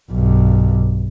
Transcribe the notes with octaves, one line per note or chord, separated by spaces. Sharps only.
B1 G2